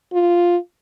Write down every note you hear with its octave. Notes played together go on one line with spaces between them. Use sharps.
F4